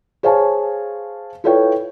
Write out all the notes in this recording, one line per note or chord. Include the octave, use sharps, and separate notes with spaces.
G#4 C5 C#5 F5 G#5 A5
E4 F4 A4 B4 C#5 G5